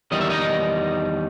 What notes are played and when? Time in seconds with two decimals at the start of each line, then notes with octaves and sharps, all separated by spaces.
0.12 E2 D#3 G3 D#5
0.21 E5
0.30 D#4 D#5